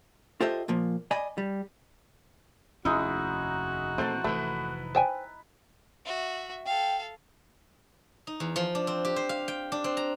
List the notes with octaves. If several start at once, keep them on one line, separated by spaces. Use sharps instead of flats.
F4 G4 A4 C5 D#5 E5
A#2 F3 A#3
D5 D#5 G#5 B5
G3
F1 D#2 G#3 C#4 D#4 E4 F#4
A#1 E3 A3 C4 C5 A5
F1 G#2 E3 A3 B4
C5 G5 G#5
F#4 E5
A4 F5 G5
D#4
E2
F3
D4
C4
G4
C5
F5
G5
D4
C4
A#5